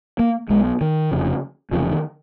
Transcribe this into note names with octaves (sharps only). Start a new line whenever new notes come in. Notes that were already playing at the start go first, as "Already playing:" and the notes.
A#3
B1 B2 G#3
D#3
F1 F2 C#3
F1 F2 C#3 F3
D#3